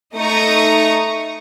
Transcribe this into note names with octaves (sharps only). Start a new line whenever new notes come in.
A3 D#4 A#5 C#6 D#6